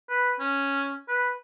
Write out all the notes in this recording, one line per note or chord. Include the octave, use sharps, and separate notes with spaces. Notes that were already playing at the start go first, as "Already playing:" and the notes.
B4
C#4
B4